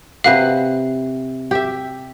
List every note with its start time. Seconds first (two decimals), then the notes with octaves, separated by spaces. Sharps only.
0.24 C3 B4 F5 F#5
1.51 G4 E5